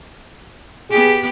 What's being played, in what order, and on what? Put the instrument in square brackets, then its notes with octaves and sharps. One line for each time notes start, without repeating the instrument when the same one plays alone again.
[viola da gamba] B3 G4 [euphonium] G#4